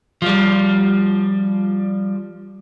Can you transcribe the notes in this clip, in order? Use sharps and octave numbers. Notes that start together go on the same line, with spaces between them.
F3 G3